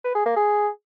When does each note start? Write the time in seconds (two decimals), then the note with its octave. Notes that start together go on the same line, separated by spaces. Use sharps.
0.04 B4
0.15 G#4
0.26 A#3
0.36 G#4